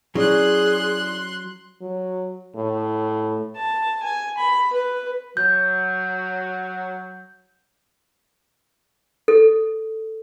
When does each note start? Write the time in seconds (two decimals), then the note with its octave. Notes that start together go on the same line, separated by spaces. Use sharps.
0.15 F#3 C#4 E4 G#4 D5 C6 F#6
1.82 F#3
2.56 A2
3.56 A5
4.03 G#5
4.37 B5
4.73 B4
5.37 F#3 G6
9.28 A4